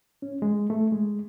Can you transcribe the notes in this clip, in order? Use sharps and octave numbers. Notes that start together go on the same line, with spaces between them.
C#4
G#3
A3
G#3